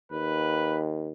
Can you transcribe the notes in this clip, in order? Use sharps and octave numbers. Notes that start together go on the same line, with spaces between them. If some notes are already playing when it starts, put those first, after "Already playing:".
D#2 B4